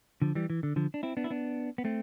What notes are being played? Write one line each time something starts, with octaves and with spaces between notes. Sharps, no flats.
D3 F3
E3 G3
E3
D3
D3 F3
D4
C4 E4
B3 D4
E4
B3 D4
B3
A3 C4